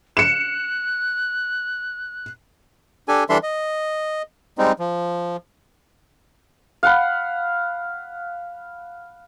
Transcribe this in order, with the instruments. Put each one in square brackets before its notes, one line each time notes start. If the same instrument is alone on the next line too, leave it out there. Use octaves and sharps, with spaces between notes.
[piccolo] F#6 [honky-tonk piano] C#7 E7
[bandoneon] D4 G4 A4 G#5
E3 G3 D4 A4 E5 C6
D#5
G3 G#3 C4 D#4
F3
[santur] F5 F#5 B5